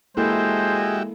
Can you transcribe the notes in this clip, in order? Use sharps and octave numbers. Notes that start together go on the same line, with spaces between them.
G#3 A#3 E4 F#4 G4 A4 C5 E5